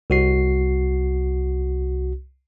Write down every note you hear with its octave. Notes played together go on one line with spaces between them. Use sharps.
C2 F#4 C7